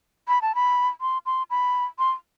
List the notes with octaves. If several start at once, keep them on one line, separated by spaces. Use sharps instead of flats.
B5
A5
B5
C6
C6
B5
C6